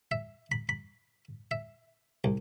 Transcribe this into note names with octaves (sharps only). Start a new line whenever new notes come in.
E5
B5
B5
E5
C2